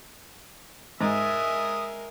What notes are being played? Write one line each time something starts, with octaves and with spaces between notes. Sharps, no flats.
G#2 G#3 A#4 E5 D#6